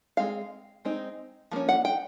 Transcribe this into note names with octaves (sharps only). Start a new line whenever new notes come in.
G#3 C4 F5
G#3 C4 D#4
F3 A#3 C#4
F#5
G5